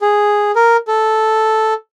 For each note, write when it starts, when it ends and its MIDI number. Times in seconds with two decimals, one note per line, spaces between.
0.01 0.51 68
0.56 0.77 70
0.88 1.74 69